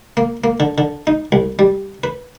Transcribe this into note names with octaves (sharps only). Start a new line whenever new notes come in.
A#3
A#3
D3
D3
D#4
C2
G3
B4